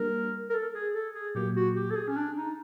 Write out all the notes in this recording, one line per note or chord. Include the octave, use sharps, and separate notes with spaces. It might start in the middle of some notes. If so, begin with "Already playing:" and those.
Already playing: G3 A#3 D4 G4 A#4
A#4
A4
G#4
A4
G#4
A#2 F#3 A#3 G4
F#4
G4
A4
G#4
C#4
D4
D#4